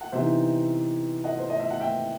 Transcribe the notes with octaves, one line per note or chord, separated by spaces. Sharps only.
F#5
C3 E3 B3 D#4 C5 E5
D#5 F#5
C5
D#5
E5
F#5
E5 G5